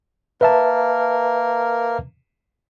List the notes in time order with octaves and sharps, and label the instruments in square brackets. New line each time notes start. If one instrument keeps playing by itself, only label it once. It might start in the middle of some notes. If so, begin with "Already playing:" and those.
[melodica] A#3 A#4 [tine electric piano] B4 E5 A5